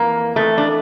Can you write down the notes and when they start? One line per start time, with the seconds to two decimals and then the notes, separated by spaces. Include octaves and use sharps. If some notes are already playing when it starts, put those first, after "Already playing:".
Already playing: F2 E3 A#3
0.36 F2 E3 A3
0.58 D4